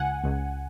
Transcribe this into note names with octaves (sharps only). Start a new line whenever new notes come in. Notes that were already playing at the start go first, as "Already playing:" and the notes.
Already playing: C#2 F#5 G#5
C#2